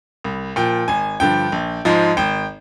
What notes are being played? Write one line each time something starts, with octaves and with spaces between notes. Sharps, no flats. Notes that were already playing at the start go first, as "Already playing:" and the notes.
C2
A#2 F3 G5
G#1 G#5
G2 D3 F3 G5
A#1
G#2 F3 G#3
G#1 G5